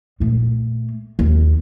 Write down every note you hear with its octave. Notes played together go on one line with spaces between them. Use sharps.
A#2 A3
D#2